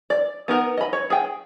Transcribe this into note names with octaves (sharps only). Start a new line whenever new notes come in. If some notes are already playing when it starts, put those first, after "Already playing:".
D5
B3 D#4 A#4
D#5 B5
C#5
G#4 G5